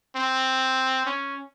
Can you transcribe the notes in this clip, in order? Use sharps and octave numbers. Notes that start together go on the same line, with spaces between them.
C4
C#4